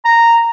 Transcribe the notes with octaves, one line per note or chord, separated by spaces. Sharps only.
A#5